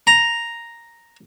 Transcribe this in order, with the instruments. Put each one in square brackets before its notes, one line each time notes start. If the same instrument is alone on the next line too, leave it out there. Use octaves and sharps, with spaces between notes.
[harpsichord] A#5